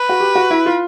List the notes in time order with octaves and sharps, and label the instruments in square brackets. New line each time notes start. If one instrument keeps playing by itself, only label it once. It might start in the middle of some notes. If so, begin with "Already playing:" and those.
Already playing: [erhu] B4
[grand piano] F#4
G4
F#4
E4
F4